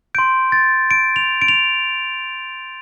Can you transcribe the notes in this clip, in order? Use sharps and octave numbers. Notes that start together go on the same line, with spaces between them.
C6 G6 D7
A6
D7
F7
D7
F7